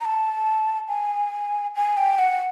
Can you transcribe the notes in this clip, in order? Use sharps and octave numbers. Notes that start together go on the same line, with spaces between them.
A#5
A5
G#5
G#5
G5
F#5